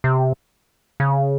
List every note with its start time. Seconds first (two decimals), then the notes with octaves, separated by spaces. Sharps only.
0.04 C3
1.00 C#3